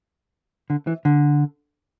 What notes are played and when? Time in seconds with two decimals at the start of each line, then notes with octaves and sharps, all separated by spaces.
0.70 D3
0.87 E3
1.05 D3